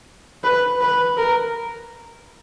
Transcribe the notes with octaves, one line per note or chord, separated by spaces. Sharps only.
B4
B4
A#4